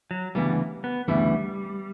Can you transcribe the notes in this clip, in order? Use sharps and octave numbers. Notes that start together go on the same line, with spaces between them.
F#3
D2 C#3 E3 G3 B3 E4
B3
D2 C#3 E3 G3 B3 E4